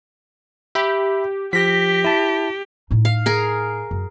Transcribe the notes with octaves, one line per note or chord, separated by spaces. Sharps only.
G4 E5 B5
F3 G4 A#6 B6
E4 A5
A2 D#4
F5
G#4 A#4
F#2